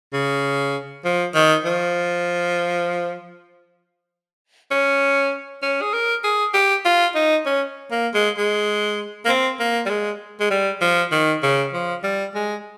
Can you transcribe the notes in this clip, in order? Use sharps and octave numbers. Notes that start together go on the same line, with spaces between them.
C#3
F3
D#3
F3
C#4
C#4
G#4
A#4
G#4
G4
F4
D#4
C#4
A#3
G#3
G#3
A#3
C4
A#3
G3
G#3
G#3
G3
F3
D#3
C#3
F3
G3
G#3